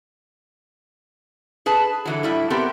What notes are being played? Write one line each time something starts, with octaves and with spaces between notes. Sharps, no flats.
G#4 B4 A5
D3 E3 F#3
A2 G3 E4
B3 C4 G4 A4 A#4